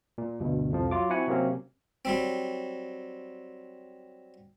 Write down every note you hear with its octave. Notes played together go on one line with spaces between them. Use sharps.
A#2
D2 G2 B2
C2 F2 F3
F#3 F4 D6
C4 E4 F#4 F#5 G#5
C3 F#3 A#3 C4 C#4
F#3 G3 C4